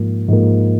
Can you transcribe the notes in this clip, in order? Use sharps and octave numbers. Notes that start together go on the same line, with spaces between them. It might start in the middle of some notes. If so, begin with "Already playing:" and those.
Already playing: G#2 F3 A#3
G#2 F3 A#3